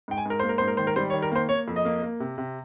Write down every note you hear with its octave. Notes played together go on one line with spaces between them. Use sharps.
G#2 G5
G#5
G#2 A#4
A#3 C5
A#4
G#2 C5
A#4
D#3 C5
A#4
G3 C5
C#5
D#3
A#4
A#3 C5
A#3 C#5
F2
D#5
A#3
A#3
C3
C3